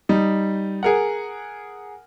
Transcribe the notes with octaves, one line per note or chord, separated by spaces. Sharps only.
G3 D#4
G#4 A#4 F#5